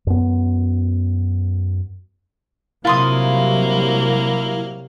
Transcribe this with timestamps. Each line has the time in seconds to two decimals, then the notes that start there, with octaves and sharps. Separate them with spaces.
0.07 F#2 B3
2.85 C3 F#3 G3 A#3 E4 F4 C6 D#6